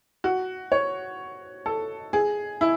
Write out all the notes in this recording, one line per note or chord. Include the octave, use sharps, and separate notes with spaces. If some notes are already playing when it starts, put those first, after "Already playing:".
F#4
C#5
A4
G#4
E4